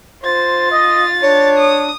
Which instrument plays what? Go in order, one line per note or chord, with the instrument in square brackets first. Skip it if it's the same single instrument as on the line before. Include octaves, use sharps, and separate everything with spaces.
[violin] F4 A6 [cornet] C5
[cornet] D#5
[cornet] D4 [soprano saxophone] C#5
[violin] D#6